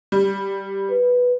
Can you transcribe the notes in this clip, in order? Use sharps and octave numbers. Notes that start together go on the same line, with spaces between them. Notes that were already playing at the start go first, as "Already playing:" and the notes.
G3
B4